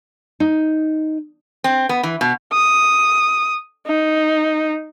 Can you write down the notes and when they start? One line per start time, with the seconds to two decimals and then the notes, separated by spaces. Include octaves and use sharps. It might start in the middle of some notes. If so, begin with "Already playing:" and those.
0.40 D#4
1.64 C4
1.89 B3
2.03 E3
2.21 B2
2.53 D#6
3.87 D#4